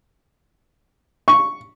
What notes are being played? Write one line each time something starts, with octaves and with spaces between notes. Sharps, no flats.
C#6